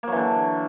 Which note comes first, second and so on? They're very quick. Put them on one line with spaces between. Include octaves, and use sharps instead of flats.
A#3 F#3 E3 D3